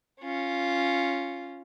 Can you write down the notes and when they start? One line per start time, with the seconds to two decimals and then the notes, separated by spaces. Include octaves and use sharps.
0.21 C#4 F4